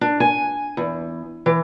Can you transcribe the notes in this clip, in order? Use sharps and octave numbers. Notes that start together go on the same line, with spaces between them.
D4
G#5
E2
E3